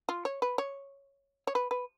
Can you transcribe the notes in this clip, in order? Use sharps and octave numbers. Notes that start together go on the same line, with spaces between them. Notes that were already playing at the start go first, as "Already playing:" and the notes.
F4
C#5
B4
C#5
C#5
B4
B4